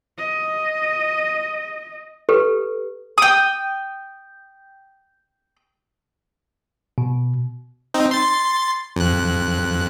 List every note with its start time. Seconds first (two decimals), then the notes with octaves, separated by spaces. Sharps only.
0.18 D#5
2.29 G4 A4 B4
3.18 G5 D#6
6.98 B2
7.94 C4 D#4
8.11 C6 A6
8.96 F2 F#6